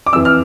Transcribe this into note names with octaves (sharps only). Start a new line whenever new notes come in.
D6
F2 E3 E6
F6